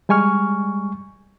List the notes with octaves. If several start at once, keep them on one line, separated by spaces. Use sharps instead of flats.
G3 G#3 G#5 C#6 F6